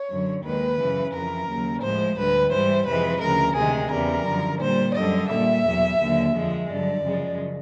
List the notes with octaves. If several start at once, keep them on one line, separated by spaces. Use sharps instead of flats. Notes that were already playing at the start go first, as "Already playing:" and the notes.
Already playing: C#5
F#2 D3 F#3
D#2 D#3 G#3 B4
F#2 C#3 E3
F2 C#3 E3 A#4
D#2 C#3 F#3
A2 F3 G#3 C5
D2 D3 G3 B4
G#2 E3 G3 C5
F2 C3 E3 G#3 B4
D2 C#3 F3 A#4
D2 C3 D#3 G#3 G#4
E2 C#3 E3 G3 A#4
F#2 D3 F3
A#2 G3 C5
F#2 D3 G3 D#5
A#2 G3 E5
E2 B2 F#3
D#2 D3 F#3
F2 D3 F3 G#3
G2 D3 F#3 D5
F#2 C#3 F3 G#3